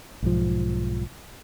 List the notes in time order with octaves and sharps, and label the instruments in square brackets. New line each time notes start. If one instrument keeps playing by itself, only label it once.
[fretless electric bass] B1 G#2 F3